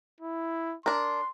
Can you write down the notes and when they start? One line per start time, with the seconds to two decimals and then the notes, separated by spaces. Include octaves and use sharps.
0.21 E4
0.86 D4 A#4 C6